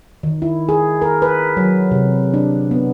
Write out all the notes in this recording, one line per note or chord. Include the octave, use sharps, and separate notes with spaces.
D#3
E4
G#4
A#4
B4
F#3
C3
D4
B3